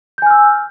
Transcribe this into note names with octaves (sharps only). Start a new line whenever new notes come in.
G#5 E6 F6 G6